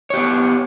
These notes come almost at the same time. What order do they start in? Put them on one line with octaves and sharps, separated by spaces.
C#5 G4 B3